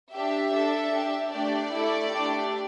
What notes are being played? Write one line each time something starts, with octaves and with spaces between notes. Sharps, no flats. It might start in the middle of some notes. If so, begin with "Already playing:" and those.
D4 G4 E5
D4 A4
D4 G4
A3 D4 G4 D5
A3 E4 A4
A3 D4 G4